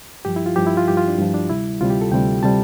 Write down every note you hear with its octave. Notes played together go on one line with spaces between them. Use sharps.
G2 F3 G4
E4
F4
G2 F3 G4
E4
F4
G2 F3 G4
F4
D4
G2 F3
D4
D2 C3 G3 E4
D2 C3 G3 F4
G4
A4
D2 C3 G3 G5
C3 G3 A5